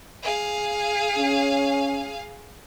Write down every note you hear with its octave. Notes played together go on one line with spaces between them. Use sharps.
G#4 F5
C#4